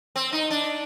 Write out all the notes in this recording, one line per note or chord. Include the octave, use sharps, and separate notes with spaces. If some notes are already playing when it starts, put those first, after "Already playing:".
C4
D#4
D4